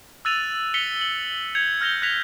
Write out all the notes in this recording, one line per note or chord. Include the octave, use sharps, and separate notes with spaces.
E6 F#6 A6 D#7 F7 F#7
B6 C#7 F7 G7
F#7
G6 G#6 C#7 F7
F6 G6 A#6 F7 G7
F#6 G#6 A#6 B6 F7